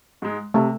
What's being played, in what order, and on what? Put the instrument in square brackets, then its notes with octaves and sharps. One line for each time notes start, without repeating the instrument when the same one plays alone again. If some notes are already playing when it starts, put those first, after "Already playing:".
[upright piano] G#2 G#3
[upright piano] C3 [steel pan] A3